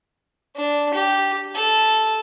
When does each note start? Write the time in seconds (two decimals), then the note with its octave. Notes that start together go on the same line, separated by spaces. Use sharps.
0.56 D4
0.94 G4
1.55 A4